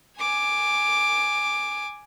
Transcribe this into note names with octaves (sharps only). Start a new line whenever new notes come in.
G#5 D6